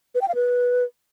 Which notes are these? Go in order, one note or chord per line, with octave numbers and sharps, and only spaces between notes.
B4
G5
F5
B4